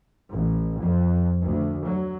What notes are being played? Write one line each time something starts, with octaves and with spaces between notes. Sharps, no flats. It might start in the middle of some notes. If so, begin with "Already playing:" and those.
A1
F2
D2
F#3